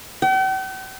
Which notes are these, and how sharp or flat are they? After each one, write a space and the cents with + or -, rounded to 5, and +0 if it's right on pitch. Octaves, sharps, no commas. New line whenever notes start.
G5 -45